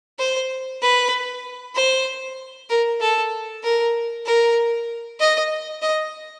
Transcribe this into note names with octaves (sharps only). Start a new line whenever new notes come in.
C5
B4
C5
A#4
A4
A#4
A#4
D#5
D#5